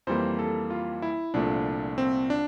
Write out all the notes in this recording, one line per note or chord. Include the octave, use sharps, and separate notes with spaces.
F2 E3 G3 A#3 C5
A4
F4
E4
C2 A#2 F3 A3 D4
C4
D4